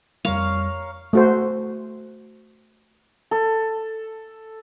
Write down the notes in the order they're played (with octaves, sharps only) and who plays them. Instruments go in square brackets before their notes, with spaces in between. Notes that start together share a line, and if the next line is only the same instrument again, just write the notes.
[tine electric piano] F2 G3 [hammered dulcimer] A#4 C#5 [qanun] F5
[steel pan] A3 F#4 C5
[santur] A4